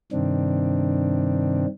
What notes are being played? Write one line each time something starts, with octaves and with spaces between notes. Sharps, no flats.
G2 C3 D#3 C4 D4